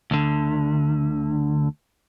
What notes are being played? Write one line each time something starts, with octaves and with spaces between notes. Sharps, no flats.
D2 D3